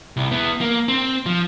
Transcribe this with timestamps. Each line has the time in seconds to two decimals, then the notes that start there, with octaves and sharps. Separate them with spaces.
0.17 C2
0.31 B3 E4
0.61 A#3
0.88 C4
1.26 F3